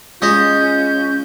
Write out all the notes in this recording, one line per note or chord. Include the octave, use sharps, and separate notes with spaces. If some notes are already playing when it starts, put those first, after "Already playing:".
G#3 C#4 F4 D#5 G6